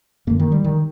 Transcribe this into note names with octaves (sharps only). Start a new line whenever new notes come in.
F#2 D3 A#3
D#3
G3
D#3